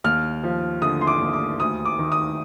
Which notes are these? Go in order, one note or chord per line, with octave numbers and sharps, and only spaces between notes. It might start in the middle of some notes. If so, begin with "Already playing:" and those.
D#2 F6
F3
D3 D#6
C6
D6
D#2
D6
D2 D#6
D6
D#3
D#6